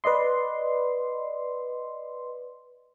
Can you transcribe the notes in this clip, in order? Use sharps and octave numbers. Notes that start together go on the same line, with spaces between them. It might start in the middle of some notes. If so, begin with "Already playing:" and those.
B4 D5 D#5 C6